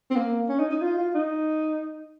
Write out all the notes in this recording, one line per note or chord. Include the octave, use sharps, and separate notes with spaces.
C4
A#3
C#4
D#4
D#4
F4
F4
D#4